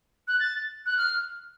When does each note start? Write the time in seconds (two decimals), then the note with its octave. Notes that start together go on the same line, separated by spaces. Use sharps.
0.28 F#6
0.40 A6
0.86 F#6
0.97 F6